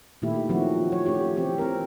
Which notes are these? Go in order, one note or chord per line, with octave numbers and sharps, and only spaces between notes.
A#2 D#3 A3 E4 G4
D#3 F3 F#3 A3 C4 F#4
F3 C#5
A3 C#4 G4 C#5
E3 C4 G4
C4 A#4